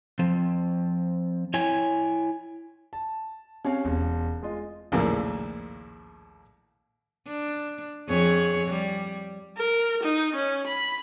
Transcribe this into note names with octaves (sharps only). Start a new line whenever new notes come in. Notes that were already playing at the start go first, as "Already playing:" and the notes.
F3 C4
E4 C#5 G5 G#5
A5
C4 C#4 G4 C#5 F5
E1
G#3 F4 D#5
A#1 D#2 A2 C#3 A#3
D4
F2 G#4 C#5
G3
A#4
D#4
C#4
B5